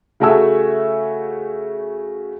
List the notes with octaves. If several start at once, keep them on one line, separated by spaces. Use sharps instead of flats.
C#3 A3 F#4 E5 G#5 E6